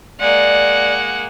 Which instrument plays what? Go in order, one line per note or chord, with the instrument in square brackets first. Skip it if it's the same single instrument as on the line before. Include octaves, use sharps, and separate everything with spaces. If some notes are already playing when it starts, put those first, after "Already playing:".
[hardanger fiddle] G#3 A#3 [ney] D5 [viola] F#5